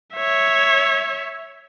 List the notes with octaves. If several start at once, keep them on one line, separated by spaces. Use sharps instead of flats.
C#5 E5